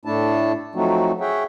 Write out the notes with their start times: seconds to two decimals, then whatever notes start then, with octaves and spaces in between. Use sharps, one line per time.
0.05 A2 A3 D4 E4 A5
0.75 F3 F#3 A3 C4 D#4 F#4
1.20 G#4 C#5 E5 F#5 G5